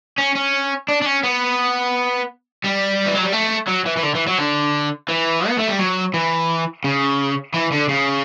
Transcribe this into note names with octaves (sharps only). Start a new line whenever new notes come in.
C#4
C#4
D4
D4
C#4
B3
G3
E3
F#3
G3
A3
F#3
E3
E3
D3
E3
F#3
D3
E3
B3
A3
G3
F#3
E3
C#3
E3
D3
C#3